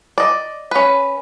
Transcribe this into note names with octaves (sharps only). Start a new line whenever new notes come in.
D5 D#5
C#4 B4